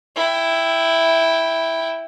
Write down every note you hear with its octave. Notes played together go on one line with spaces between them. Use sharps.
E4 G5